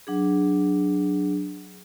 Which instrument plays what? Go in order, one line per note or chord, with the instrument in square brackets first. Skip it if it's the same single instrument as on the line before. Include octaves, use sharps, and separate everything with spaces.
[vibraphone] F#3 D4 G#4